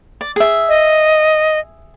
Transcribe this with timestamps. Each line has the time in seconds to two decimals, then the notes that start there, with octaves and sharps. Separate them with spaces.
0.21 D5
0.36 G#4 E5
0.69 D#5